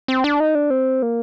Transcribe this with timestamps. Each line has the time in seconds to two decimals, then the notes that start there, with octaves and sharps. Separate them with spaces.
0.08 C4
0.24 D4
0.40 D#4
0.55 D4
0.70 C4
1.02 A#3